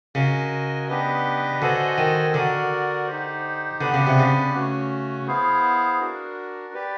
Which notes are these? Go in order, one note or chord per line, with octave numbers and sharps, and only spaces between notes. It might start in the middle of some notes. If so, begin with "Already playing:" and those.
C#3 F#4 A#4 D#5 G#5
B3 D4 G4 B4 D#5
D3 F#4 A4 C5 D#5 G#5
D#3
D3 F#4 A#4 D5
D#4 G4 C5
D3 B3 D4 G4 B4
C#3
C3
C#3
A3 C#4 F#4
B3 E4 G#4 C5 F5
D4 F#4 A#4
G4 B4 D5